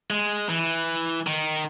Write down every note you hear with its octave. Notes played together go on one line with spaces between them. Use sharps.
G#3
E3
D#3